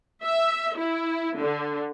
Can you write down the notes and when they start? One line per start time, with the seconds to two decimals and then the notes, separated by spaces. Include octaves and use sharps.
0.23 E5
0.77 E4
1.39 D3